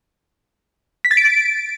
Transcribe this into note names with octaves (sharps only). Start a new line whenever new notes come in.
B6
A6
D7